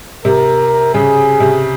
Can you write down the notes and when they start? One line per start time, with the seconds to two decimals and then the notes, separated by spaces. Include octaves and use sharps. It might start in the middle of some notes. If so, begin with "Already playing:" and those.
0.25 C3 A#4
0.94 C#3 G#4
1.40 C3